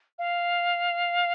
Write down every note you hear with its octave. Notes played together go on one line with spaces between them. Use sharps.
F5